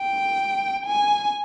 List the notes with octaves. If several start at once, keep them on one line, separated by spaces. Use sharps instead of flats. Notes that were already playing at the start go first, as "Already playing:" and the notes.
Already playing: G5
G#5